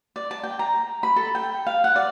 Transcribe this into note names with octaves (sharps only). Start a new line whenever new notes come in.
D5
A5
G5
A#5
B5
A4
G5
F5
F#5
D5